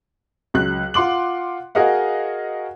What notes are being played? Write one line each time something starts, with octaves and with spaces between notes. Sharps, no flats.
C#2 F#3 F#6
F4 F#5 C6 D6 F#7
F#4 G#4 A#4 D#5 F5 F#5